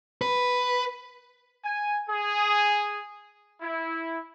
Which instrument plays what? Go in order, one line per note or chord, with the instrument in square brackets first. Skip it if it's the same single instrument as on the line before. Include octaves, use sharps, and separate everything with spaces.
[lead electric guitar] B4
[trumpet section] G#5
G#4
E4